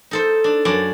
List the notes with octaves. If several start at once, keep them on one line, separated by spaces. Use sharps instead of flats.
D#4 A4 C5
D4
F#2 D4 D5